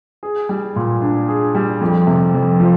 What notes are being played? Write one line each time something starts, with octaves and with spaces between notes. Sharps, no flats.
G#4
G3
A#2
D4
G#4
G3
F2
C3
F2
F3